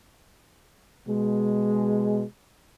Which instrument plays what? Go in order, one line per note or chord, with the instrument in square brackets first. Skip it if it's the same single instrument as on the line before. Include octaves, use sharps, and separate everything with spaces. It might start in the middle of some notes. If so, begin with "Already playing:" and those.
[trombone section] B2 G#3